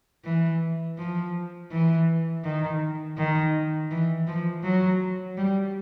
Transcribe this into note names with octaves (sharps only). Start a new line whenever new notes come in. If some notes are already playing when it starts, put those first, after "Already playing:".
E3
F3
E3
D#3
D#3
E3
F3
F#3
G3